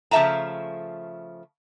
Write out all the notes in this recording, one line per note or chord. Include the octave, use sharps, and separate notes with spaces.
C#3 F3 A3 E5 A5 A#5